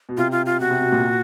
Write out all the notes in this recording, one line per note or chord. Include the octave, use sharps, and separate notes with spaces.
B2
C3 F4
F4
F4
B2 F#4
C3
B2
A#2